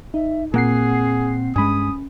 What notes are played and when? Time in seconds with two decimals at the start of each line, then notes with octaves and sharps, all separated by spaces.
0.14 D#4 E5
0.54 A#2 A#3 C4 G#4 F#5 C7
1.56 G2 G#3 C#4 G#5 B5 D#6